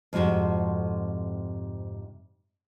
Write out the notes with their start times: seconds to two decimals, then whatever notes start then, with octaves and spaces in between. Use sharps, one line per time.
0.13 F2 G#2 C3 F#4 A4